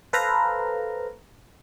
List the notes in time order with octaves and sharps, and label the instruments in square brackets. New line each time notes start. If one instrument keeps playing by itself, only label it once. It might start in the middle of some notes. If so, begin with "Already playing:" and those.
[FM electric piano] A4 B4 C5 F5 A#5